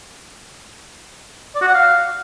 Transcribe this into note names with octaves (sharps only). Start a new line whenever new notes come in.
D5
F#4
F#5
F5